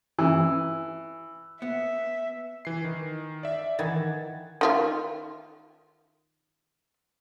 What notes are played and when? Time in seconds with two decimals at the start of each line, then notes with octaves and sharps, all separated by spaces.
0.19 E3
1.62 B3 E5
2.65 E3 C7
2.84 D#3
3.43 D5 E5
3.79 D#3 E3 F#5 G#6 A6
4.61 D#3 F4 E5